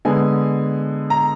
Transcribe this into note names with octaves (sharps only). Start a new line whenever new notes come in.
D3 G#3 B3 G#5
A#5